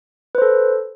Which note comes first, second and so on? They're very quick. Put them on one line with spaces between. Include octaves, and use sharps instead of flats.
B4 C5 A4